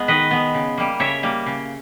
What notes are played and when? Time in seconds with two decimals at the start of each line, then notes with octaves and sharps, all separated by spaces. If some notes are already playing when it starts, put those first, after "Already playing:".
Already playing: G#3 B3
0.08 D#3 B4 D#5
0.31 G#3 B3
0.54 C#3
0.78 G3 A#3
1.00 C#3 C#5 E5
1.23 G3 A#3
1.46 C#3